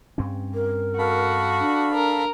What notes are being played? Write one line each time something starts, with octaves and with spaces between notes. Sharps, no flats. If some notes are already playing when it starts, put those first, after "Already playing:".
G2 C4 C#4
A#4
F#4 A4 F5 B5
D4
A#4